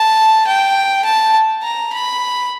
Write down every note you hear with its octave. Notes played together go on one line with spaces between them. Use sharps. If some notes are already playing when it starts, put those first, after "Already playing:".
Already playing: A5
G5
A5
A#5
B5